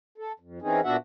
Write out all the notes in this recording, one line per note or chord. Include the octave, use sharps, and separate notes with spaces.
A4
F2
E3 C4 C#4 D#4 G#4
A#2 B3 D4 F#4 E5 F#5